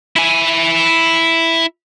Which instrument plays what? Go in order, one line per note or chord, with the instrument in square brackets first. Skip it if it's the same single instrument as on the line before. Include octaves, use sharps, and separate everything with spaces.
[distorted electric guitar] E4 G#5